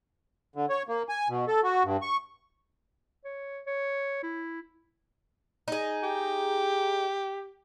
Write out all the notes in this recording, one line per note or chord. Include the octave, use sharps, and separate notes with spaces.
D3
C#5
A#3
G#5
B2
A4
F#4
G2
C#6
C#5
C#5
E4
D#4 G#4
G4